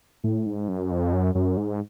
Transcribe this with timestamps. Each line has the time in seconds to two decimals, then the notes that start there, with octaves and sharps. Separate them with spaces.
0.24 A2
0.46 G#2
0.68 F#2
0.91 F2
1.13 F#2
1.35 F#2
1.57 G#2